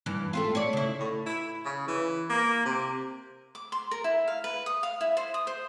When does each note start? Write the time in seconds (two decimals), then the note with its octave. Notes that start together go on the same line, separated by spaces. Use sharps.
0.06 G2 E3
0.33 A3 C4 F4
0.55 C#5 D5
0.73 C#3 E4
1.00 A2
1.26 E4
1.65 C#3
1.88 E3
2.29 A#3
2.65 C3
3.55 D6
3.72 C6
3.91 A#4
4.04 E4
4.28 F5
4.44 B4
4.66 D#6
4.83 F5
5.01 E4
5.17 C5
5.34 D#6
5.47 C5